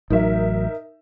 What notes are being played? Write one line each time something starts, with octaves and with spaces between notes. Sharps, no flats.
A1 F#3 D#4 A#4 E5